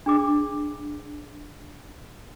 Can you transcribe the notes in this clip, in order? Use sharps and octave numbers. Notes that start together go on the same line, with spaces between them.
D4 G#4 D6